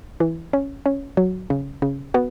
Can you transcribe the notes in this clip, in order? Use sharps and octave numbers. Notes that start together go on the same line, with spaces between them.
E3
C#4
C#4
F#3
C#3
C#3
B3 F#4